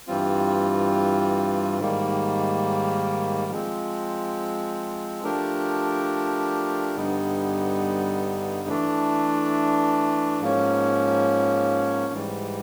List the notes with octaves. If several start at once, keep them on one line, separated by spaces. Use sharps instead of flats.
G2 E3 G3 C4 F4
G#2 D#3 G3 A#3
F3 G#3 C4
F3 A3 D4 G4 A#4
G2 D3 G3 B3 D#4
E3 A3 D4
G#2 F3 A#3 C#4
G#2 E3 G3